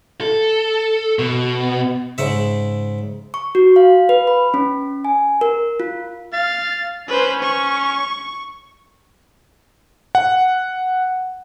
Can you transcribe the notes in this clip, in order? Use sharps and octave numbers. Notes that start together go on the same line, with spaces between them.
A4
B2
G#2 C#3 E5
C#6
F#4
F5
B4
B5
C#4
G#5
A#4
F4
F5 A6
C#4 B4 C5
C#6
F#5